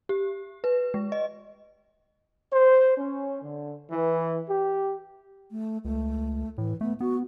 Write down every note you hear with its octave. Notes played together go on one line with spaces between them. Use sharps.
G4
B4
G#3
D#5
C5
C#4
D3
E3
G4
A3
C#2 A3
A2 E3
A3 B3
B3 F#4